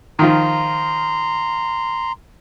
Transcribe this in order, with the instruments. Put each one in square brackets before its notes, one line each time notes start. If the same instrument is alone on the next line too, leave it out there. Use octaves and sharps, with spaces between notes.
[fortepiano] D#3 F3 F4 [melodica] A#5 C6